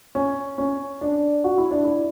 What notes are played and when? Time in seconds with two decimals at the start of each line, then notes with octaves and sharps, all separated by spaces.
0.15 C#4
0.58 C#4
1.01 D4
1.44 F#4
1.58 E4
1.71 D4
1.85 E4